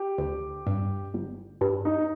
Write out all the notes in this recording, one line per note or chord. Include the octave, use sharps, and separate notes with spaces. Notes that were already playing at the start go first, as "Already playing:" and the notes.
Already playing: G4
D2
G2
G1
G2
D#4